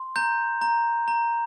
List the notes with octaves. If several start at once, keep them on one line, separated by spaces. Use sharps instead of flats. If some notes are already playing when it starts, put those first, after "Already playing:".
Already playing: C6
A#5 G6
A#5
A#5